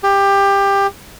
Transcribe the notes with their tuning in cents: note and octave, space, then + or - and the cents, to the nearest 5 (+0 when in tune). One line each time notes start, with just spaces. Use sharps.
G4 +20